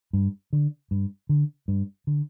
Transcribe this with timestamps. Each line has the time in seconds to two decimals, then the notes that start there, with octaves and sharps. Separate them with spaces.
0.13 G2
0.53 D3
0.91 G2
1.29 D3
1.68 G2
2.07 D3